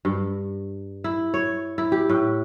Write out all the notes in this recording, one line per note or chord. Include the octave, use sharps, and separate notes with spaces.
G2
E4
C#5
E4
G4
A2